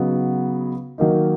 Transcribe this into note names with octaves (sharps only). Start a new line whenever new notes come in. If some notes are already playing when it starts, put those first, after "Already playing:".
Already playing: C#3 F#3 B3 D#4
D#3 F#3 A#3 D#4